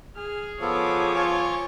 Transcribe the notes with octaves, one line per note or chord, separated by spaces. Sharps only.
G#4 F6
F3 B3 A4 C#5 D6
F4 G#5 C#6